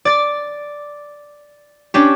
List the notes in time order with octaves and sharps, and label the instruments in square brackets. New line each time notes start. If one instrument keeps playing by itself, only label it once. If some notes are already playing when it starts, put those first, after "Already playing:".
[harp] D5 A6
C#4 D4 G4